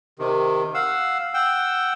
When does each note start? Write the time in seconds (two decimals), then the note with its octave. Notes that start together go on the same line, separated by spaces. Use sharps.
0.19 C3 D#3
0.74 F5 F#5 E6
1.34 F#5 G5 E6